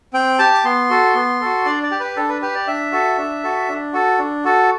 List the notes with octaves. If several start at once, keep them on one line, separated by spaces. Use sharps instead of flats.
C4 G5
G4 A5
D6
B3 C6
F#4 A4
B3
F#4 A4
D4 D5
D5
G4
B4
D4 A4
B4
G4 B4
D5
D4 E5
F#4 A4
D4
F#4 A4
D4
F#4 A4
D4
F#4 A4